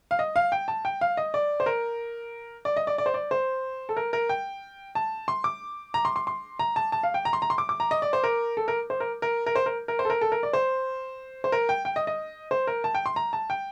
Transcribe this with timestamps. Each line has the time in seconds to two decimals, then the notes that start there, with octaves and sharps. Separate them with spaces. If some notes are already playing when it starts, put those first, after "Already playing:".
0.11 F5
0.19 D#5
0.36 F5
0.52 G5
0.68 A5
0.85 G5
1.01 F5
1.17 D#5
1.34 D5
1.60 C5
1.66 A#4
2.65 D5
2.77 D#5
2.87 D5
2.98 D5
3.06 C5
3.14 D5
3.31 C5
3.89 A4
3.97 A#4
4.13 A#4
4.29 G5
4.95 A5
5.28 C6
5.44 D6
5.94 A#5
6.05 C6
6.16 C6
6.27 C6
6.59 A#5
6.76 A5
6.92 A5
7.03 F5
7.14 G5
7.25 A#5
7.33 C6
7.42 A#5
7.50 C6
7.58 D6
7.69 D6
7.80 A#5
7.91 D#5
8.02 D5
8.13 C5
8.24 A#4
8.57 A4
8.68 A#4
8.90 C5
9.00 A#4
9.22 A#4
9.46 A#4
9.55 C5
9.66 A#4
9.88 A#4
9.99 C5
10.05 A4
10.10 A#4
10.21 A4
10.32 A#4
10.43 D5
10.53 C5
11.44 C5
11.52 A#4
11.69 G5
11.85 G5
11.96 D#5
12.07 D#5
12.51 C5
12.67 A#4
12.84 A5
12.95 G5
13.06 C6
13.16 A#5
13.33 A5
13.50 G5